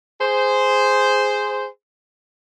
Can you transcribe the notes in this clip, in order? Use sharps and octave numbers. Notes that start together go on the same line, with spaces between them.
G#4 C5